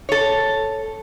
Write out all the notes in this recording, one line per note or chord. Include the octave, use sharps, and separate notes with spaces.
A4 C#5